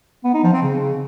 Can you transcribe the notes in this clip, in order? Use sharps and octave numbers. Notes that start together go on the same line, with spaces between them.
B3
D#4
F3
C4
C#3